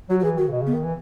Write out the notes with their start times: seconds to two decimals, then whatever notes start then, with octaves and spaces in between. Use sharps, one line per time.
0.09 F#3 F#4
0.20 F#4
0.23 E3 G#4
0.38 D#3 F#4
0.48 C#3
0.52 B2
0.62 C#3
0.67 B3
0.74 D#3
0.84 E3